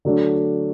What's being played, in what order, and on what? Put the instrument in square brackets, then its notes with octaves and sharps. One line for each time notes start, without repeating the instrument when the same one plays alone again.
[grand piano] D3 F#3 A3 D4